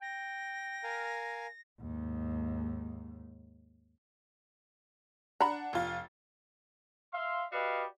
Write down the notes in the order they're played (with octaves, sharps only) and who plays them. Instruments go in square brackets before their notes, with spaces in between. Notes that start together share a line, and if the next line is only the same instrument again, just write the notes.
[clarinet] G5 [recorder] A#6
[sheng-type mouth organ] A#4 F5 G#5
[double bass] D#2 G#2
[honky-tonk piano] D4 F#5 [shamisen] A#5 B5
[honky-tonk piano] F1 F4 A6
[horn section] E5 F5 C6
F#4 G4 B4 D5 D#5 F5